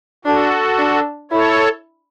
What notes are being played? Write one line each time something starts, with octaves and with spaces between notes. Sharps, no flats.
D4 F#4 A4
D4
E4 A4 C#5